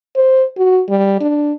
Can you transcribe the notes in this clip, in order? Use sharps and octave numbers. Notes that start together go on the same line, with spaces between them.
C5
F#4
G3
D4